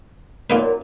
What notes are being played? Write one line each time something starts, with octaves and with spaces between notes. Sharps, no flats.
F#2 A#2 A#3 D#4 B4